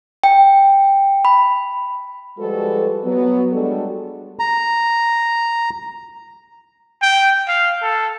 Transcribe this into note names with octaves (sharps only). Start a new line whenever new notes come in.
G5
B5
F3 G3 G#3 F#4 A4 B4
F#3 B3
G3 G#3 D4 F#4 A4
A#5
G5
F5
A4